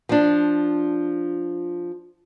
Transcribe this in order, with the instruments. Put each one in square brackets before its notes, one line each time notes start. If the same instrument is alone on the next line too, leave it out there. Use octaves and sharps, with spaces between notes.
[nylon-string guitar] F3 D4